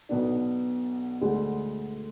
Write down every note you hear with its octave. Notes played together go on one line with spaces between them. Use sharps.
B1 B2 B3 D4
D2 D3 G#3